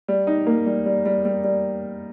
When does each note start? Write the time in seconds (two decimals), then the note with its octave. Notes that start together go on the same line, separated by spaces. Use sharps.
0.08 G3
0.27 D#4
0.47 A#3
0.66 G3
0.86 G3
1.06 G3
1.25 G3
1.44 G3